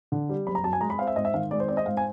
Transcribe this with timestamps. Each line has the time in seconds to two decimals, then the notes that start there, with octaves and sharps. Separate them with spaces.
0.12 D3
0.29 G3
0.47 F#1 B5
0.55 A#5
0.64 F#2 A5
0.73 G#5
0.81 G#3 A#5
0.90 B5
0.99 C4 F5
1.07 E5
1.16 G#2 D#5
1.25 E5
1.34 D#3 F5
1.51 G#3 D5
1.60 C5
1.68 C4 D5
1.77 D#5
1.86 G#2 F5
1.97 G#5